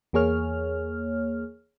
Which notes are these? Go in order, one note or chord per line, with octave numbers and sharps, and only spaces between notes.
E2 A#3 G#4 C#5 F6